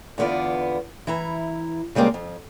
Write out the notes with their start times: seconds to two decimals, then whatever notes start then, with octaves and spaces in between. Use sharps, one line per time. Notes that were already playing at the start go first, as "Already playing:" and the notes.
0.18 E2 D3 B3 F4 D5
1.07 E3 E4 A#5
1.95 C#3 G3 G#3 A#3 C4
2.14 F2